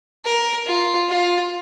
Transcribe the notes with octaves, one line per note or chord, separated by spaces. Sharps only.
A#4
F4
F4